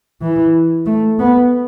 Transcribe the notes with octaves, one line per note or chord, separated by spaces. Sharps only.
E3
A3
B3